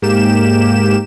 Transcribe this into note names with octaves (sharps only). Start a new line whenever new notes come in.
G#2 A#3 G4 E7